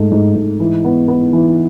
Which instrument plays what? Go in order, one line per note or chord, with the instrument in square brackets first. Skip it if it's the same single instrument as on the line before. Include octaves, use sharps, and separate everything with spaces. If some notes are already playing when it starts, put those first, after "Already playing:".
Already playing: [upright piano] G#2 A3
G#2
G#2
E3
B3
B3
E3